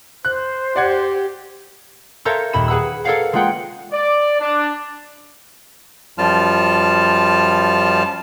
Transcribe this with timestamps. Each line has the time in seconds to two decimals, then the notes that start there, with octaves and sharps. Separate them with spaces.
0.25 C5 F#6
0.76 G4 D5 F#5 G#6
2.25 A4 A#4 C5 C#5 E5 F5
2.53 D#2 A#2 B5 E7
2.68 G#4 B4 F#5 B5 E6
3.04 A4 A#4 C#5 D5 F5 F#5
3.33 G#3 A#3 F4 G#4 F#5 G5
3.92 D5
4.40 D4
6.18 F#2 F3 G3 F4 A5 F6